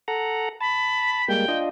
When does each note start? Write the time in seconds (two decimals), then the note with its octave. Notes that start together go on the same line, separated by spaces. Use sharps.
0.08 A4 F#5 A#5
0.61 A5 B5
1.28 G3 G#3 A#3 G5
1.48 D4 F4 D#5